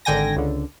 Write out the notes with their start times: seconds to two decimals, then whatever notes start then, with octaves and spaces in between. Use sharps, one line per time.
0.05 G#1 D3 G5 G#5 A#6
0.36 C#2 D3